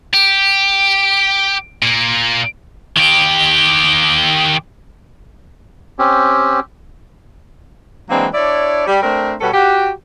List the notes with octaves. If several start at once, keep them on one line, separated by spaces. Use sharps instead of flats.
G4
A#2 A#3
D#3 G4
C4 C#4 G4
E3 F#3 G#3 A#3 C4 D4
D4 E4 C#5 D5
G3
A3 C4 D4 A#4 C5
B2 G3 F#4 A4 B4 C#5
F#4 G4